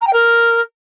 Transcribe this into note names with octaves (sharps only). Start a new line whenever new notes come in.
A#5
G5
A#4